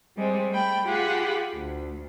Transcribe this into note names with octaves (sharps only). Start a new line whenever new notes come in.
G3 G#3 C4
A3 G5 B5
F4 G4 G#4 F#5 G#5 B5
D2